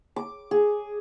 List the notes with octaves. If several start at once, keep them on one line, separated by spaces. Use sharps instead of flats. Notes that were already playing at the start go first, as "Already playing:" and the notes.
D6
G#4